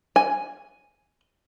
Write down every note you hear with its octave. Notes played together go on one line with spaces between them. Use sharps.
G#5